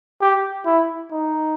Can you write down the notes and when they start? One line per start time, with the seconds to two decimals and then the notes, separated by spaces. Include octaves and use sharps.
0.21 G4
0.66 E4
1.11 D#4